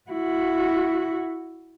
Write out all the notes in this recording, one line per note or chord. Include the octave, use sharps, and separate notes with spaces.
E4 F#4